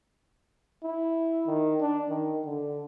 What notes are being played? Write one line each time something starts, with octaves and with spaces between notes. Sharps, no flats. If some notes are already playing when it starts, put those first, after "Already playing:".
E4
D#3
D4
D#3
D3